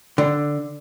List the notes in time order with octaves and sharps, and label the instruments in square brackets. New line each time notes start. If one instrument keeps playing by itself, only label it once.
[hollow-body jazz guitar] D3